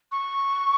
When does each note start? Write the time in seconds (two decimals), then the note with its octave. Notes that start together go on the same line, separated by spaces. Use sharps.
0.12 C#6